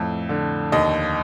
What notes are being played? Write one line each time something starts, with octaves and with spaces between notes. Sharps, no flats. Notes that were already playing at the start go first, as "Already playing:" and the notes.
Already playing: F2 A2
D3
D#2 D#5